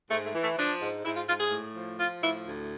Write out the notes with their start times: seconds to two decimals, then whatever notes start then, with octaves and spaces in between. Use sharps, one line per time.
0.10 G#2 A3
0.25 A3
0.34 E3
0.42 A3
0.58 F3 D4
0.81 G#2
1.05 G#2 E4
1.17 F4
1.27 G#2 F4
1.39 G#4
1.51 A2
1.75 F3
1.98 F3 F4
2.21 A2 E4
2.45 D2